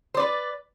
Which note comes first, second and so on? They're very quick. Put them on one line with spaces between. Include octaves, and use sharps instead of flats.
C5 D5 B4